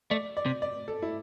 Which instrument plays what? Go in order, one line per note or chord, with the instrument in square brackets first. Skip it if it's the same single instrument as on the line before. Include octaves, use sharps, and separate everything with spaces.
[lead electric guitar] A3 [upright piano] D5
[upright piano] D5
[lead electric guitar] C3
[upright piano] D5
A4
E4